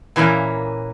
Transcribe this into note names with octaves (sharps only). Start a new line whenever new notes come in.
A#2 E3 A#3 C#4